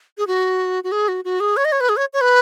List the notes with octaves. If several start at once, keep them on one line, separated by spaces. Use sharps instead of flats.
G#4
F#4
F#4
G#4
F#4
F#4
G#4
C#5
D#5
C#5
B4
G#4
C#5
C#5
B4